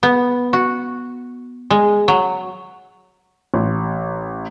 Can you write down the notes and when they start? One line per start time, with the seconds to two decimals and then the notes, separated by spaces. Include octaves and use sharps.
0.03 B3
0.53 F#4
1.70 G#3
2.08 F#3
3.54 A1